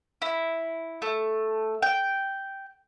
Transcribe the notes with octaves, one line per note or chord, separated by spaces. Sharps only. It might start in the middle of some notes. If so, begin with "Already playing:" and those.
E4
A3
G5